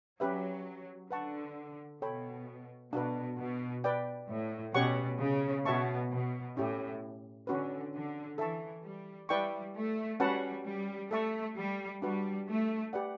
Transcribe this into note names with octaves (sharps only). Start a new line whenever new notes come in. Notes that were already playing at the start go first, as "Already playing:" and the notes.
F#3 C#4 G4 B4 E5
D3 B4 F#5 A5 C#6
B2 A4 C#5 G5 B5
B2 D4 F#4 B4
B2
B4 D5 G5
A2
B2 C#4 G4 C#5 F#5 C#6
C#3
B2 F#4 C#5 E5 A5 C#6
B2
A2 C#4 E4 G4
D3 C#4 F#4 B4
D3
E3 A4 E5 A5 C#6
G3
G3 E4 B4 D5 G5 C#6
A3
G3 C#4 F#4 B4 F#5 A5
G3
A3 A4 E5 A5 C#6
G3
G3 D4 F#4 B4
A3
G4 B4 D5 F#5